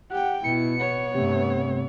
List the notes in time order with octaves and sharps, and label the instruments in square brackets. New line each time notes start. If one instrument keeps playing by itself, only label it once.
[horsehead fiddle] G4 G5 [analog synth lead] F#5
[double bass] B2 [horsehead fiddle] E4 [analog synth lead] C#7
[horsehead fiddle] B3 C#5
[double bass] G2 A3 [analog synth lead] C3